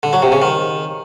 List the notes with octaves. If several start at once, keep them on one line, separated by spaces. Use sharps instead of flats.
D3
F#3
C3
C#3
D#3